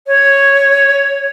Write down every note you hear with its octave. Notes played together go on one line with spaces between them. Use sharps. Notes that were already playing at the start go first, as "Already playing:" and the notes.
C#5